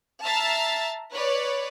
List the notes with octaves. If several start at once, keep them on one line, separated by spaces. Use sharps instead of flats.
E5 A5 A#5 F6 A6 C7
B4 C#5 D5